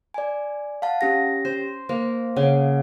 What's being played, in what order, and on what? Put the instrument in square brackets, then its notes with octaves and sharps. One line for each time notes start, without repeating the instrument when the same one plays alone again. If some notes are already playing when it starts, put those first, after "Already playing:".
[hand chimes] D5 G#5
F5 F#5 A5
C#4 G4 A#6
[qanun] C5
[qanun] A#3 [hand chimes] C5
[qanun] C#3 [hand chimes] F#5